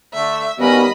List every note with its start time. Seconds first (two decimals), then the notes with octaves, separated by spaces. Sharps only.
0.15 D3 A3 E5
0.59 D#2 G3 B3 C#4 F#4 A#4 D#5 B5